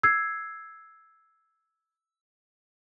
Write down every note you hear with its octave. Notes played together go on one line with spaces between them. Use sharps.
E6 G#6 C7